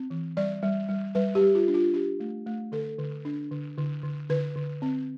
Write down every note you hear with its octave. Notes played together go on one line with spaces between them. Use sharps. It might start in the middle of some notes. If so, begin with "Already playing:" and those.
Already playing: C4
E3
G3 D5
G3
G3
G3 B4
G4
G3
F4
D4
F4
D4 G4
A3
A3
D3 A4
D3
D4
D3
D3
D3
D3 B4
D3
C4